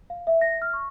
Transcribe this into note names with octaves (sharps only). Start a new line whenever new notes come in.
F5
E5
A#6
F6
C#6